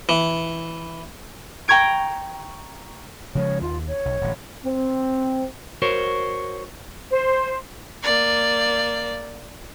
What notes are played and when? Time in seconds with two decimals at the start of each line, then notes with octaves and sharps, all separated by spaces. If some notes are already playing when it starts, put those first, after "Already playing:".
0.09 E3
1.68 G5 A#5 C#6 G#6 D7
3.35 C#3 F3 G#3 C#5
3.61 D#2 F4
3.87 C#5
4.05 B1
4.21 D1 A1
4.65 C4
5.82 F#4 A#4 C5 C#5
7.11 C5
8.03 A#3 D5